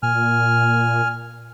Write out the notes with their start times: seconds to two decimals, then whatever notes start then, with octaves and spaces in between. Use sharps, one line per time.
0.03 A#2 G#5 F6